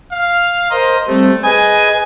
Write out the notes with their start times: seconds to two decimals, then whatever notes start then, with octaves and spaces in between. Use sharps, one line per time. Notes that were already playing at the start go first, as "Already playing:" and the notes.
0.12 F5
0.71 A#4 C5 D#5
1.08 G3 A3 C4
1.44 G#4 B4 D#5 G#5